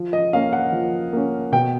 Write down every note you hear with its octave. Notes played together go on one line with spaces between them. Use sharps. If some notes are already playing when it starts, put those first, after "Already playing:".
Already playing: F3
D#5
A#3 C#4 F5
F#5
F3
A#3 C#4
B2 G5